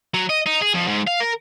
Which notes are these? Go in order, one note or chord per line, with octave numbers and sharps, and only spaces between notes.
F#3
D#5
D#4
G#4
F2
G#2
F5
A#4